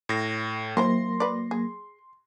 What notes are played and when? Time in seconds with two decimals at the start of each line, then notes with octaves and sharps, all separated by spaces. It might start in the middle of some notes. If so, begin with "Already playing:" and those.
0.09 A2 A#6
0.77 D#3 F#3 A#3 E4 C5 C6 A#6
1.20 B4 D5
1.51 G#4